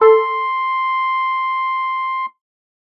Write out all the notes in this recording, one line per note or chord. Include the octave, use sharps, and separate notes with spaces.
A4 C6